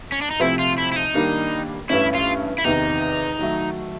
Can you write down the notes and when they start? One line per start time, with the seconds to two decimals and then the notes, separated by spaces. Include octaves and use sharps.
0.12 C#4
0.21 D4
0.31 D#4
0.40 C3 F3 A3 C4 E4
0.59 F4
0.78 E4
0.92 E4
0.96 D#4
1.14 D#3 G3 A#3 D4
1.89 G2 E3 A3 C#4 E4
2.15 F4
2.58 E4
2.64 E2 C3 D#3 D#4
3.39 D#3 F#3 A3